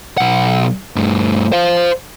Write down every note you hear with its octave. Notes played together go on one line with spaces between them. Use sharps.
B1 F#5
G2 A3
C5 F5